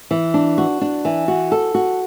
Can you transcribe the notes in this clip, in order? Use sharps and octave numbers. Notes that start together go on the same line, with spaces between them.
E3
D4
F#4
D4
E3
F#4
A4
F#4